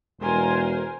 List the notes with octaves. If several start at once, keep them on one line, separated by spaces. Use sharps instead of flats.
E1 A#4 C5 G#5